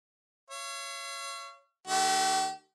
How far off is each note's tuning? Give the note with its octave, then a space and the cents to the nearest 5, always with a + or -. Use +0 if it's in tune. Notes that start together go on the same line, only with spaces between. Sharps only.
C#5 +0 F5 -45
D3 +45 A3 +0 G4 -40